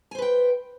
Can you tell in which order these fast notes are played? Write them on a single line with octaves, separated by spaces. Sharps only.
G#5 C5 B4 G5